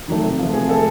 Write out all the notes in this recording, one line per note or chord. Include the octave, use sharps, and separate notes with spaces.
D#3 F#3 A3
C3
F3 A3
C3 G#4
F3 A3 A4